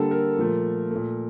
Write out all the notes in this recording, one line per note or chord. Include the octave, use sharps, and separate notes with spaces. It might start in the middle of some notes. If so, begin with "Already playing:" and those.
Already playing: D3 G3 A#3 A4
A#4
A#2 F3 A3
A#2 A3